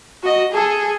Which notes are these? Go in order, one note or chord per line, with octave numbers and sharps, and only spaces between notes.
F#4 D#5
G#4 A4